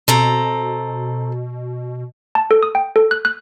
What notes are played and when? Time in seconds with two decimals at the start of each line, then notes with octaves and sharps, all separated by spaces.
0.08 B2 C4 A4 A#5
2.35 A5
2.51 A4
2.63 D#6
2.75 G5
2.96 A4
3.11 F#6
3.25 F#6